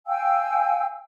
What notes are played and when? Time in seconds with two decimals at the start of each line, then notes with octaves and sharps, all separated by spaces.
0.07 F5 G5 G#5 E6